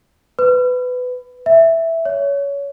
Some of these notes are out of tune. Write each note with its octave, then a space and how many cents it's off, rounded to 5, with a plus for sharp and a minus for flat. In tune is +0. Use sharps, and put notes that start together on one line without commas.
B4 +20
E5 +0
C#5 +25